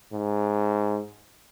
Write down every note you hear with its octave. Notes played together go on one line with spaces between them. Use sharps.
G#2